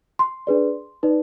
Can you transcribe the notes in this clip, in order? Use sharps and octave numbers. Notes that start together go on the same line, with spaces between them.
C6
D4 G#4 B4 D5
D#4 B4 D5